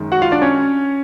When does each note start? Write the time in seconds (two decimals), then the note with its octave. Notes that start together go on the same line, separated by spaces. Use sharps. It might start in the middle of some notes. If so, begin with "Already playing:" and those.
Already playing: F#2 D#3 G#3
0.12 F#4 F#5
0.22 F4 F5
0.32 D4 D5
0.42 C#4 C#5